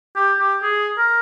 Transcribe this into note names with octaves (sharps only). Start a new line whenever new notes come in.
G4
G4
G#4
A#4